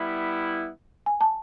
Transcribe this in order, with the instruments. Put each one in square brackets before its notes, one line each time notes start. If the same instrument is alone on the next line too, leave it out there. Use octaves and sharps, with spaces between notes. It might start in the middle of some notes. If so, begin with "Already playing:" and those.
Already playing: [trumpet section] G3 B3 E4
[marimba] G#5
A5